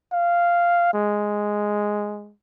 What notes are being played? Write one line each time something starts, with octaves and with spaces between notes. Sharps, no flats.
F5
G#3